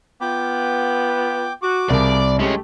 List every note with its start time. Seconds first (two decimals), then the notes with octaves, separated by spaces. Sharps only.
0.21 B3 F4 G5 D6
1.62 F#4 D6
1.90 C2 F3 G#4 A#4 D5
2.39 G#3 A3 C#4 G4